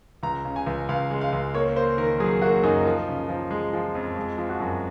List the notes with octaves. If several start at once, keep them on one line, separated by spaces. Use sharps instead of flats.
C#2 A#5
C#3
G#5
C#2
C#2 F5
G#3
F5
C#2
A#3 C#5
A#3 C5
D#3 A#4
F#3 G#4
A#3 F#4
F#2 D#4
F3
C#3
F3
G#3
F3
F2
G#3
F3
F#4
F#2